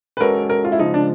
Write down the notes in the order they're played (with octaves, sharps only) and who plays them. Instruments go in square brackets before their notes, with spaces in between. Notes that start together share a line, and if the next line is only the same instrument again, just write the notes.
[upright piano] B4
[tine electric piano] G#3 C#4 F#4 A4 [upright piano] A#4
[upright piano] A#4
F4
E4
[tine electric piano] C#3 F3 G#3 [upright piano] D#4
[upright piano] D4